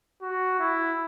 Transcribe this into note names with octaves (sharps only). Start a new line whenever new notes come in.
F#4
E4